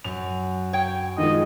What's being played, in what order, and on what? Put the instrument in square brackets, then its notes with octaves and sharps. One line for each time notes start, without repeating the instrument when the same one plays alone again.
[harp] F#2 [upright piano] F7
[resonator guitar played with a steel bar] C#5 G5
[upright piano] D#3 F3 G#3 [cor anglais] D#5